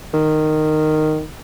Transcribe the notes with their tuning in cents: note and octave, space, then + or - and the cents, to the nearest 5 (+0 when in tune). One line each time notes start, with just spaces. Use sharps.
D#3 -10